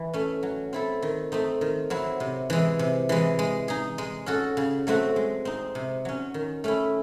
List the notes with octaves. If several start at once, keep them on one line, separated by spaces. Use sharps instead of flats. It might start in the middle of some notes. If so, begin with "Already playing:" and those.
Already playing: E3
A3 C#4
F#3
C4 E4 A4
D#3
A3 C4 D#4
D#3
F#3 C4 E4
C3
E3 G#3
C3
E3 G#3
G#3
D#4 G#4
G#3
C#4 F#4 A4
C#3
F#3 A3 C4 F#4
G#3
C4 D#4
C3
F#3 C#4
D#3
A3 C#4 E4